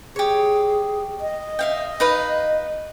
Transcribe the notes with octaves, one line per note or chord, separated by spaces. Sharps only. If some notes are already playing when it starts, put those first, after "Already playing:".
G4 G#4 C#5
D#5
E5 F5 G5
D#4 B4 F5